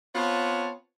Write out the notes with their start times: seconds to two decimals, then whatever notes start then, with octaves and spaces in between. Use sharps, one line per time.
0.15 B3 C4 F4 C#5 A5